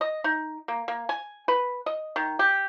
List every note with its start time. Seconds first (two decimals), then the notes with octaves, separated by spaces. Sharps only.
0.01 D#5
0.24 D#4
0.68 A#3
0.88 A#3
1.09 G#5
1.48 B4
1.86 D#5
2.16 D#3
2.39 G4